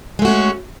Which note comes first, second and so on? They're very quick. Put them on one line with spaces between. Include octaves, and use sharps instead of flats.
G#3 A3 F#4 C#4